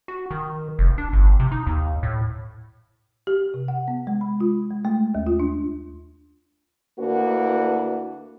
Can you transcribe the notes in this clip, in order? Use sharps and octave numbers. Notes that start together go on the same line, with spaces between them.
F#4
D#3
F1
D4
G1
C3
D#4
D#2
A2
G4
C3
F#5
B3
G#3
B5
F4
G#3
A3
D#2
F4
D4
D2 A#3 D4 E4 F#4 B4